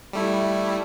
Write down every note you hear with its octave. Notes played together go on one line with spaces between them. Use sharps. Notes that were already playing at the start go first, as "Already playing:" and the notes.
G3 A3 E4